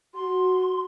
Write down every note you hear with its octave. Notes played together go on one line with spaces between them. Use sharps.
F#4 C6